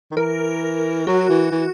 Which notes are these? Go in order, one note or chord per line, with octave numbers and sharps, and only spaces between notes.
D#3
E3 A#4
F#3 F#4
E3
E3